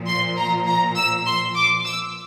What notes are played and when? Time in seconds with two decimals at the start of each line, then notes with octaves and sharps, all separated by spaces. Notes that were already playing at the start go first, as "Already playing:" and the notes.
Already playing: A#2 F3
0.08 C6
0.38 A#5
0.67 A#5
0.96 E6
1.26 C6
1.56 D6
1.85 E6